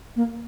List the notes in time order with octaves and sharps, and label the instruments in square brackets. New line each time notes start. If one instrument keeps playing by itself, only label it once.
[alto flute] A#3